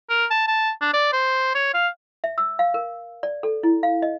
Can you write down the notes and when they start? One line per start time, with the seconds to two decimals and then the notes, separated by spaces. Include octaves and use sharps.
0.10 A#4
0.31 A5
0.48 A5
0.82 D4
0.94 D5
1.13 C5
1.55 C#5
1.74 F5
2.24 E5
2.38 E6
2.59 F5
2.74 A#4
3.23 D5
3.43 A4
3.63 E4
3.83 F5
4.02 D#5